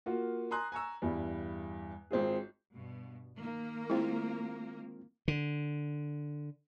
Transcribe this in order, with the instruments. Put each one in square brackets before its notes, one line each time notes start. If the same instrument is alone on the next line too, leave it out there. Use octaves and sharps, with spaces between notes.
[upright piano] A#3 F4 F#4
G#5 A#5 C6 D#6 F#6
G#5 A#5 C#6 E6
E2 G2 G3 E4
G#1 C4 F4 G#4
[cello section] G2 B2
D#3 A#3 A#4
[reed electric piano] G#3 C4 F4 [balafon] E4
[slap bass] D3